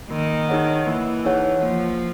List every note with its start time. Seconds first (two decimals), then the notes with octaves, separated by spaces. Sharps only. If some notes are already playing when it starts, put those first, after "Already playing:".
0.11 D#3 A#3
0.49 D#4 G#4 C#5 F#5
0.87 E3 A#3
1.25 D#4 G#4 C#5 F#5
1.62 F3 A#3